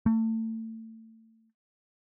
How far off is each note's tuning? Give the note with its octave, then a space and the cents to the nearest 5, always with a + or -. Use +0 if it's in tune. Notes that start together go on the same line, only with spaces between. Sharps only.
A3 +30